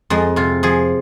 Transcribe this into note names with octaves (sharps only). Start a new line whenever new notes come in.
F2 G#3
C3 F4
F3 G#4